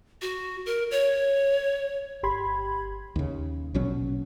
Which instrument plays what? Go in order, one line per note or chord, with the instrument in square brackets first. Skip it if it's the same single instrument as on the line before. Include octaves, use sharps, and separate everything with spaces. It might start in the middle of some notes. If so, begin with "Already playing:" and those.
[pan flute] F#4
A#4
C#5
[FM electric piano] G1 G4 B5 C6 G#6
[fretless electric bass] D#2 C#3
A#1 B2 F#3 C#4